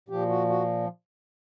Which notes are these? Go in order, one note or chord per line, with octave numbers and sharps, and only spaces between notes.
A#2 F3 G4
F#4
F#4